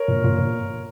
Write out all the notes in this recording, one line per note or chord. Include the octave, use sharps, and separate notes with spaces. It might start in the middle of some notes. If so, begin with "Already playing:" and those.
Already playing: A#4 C#5
A#2
A#2
A#2